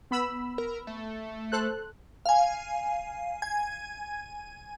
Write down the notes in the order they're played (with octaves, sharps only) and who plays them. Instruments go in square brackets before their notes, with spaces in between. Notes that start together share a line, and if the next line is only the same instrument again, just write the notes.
[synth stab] B3 B5 E6
[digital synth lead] A#4
A3
[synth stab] A4 C5 F#6
[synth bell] F5 G#5
G#5 G#6